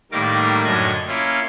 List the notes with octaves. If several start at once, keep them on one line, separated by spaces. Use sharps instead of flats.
A2 D#3 G3 A#3 A#4 D6
F#2 A2 D3 D#5 G#6 A#6
A#3 C#4 E4 F4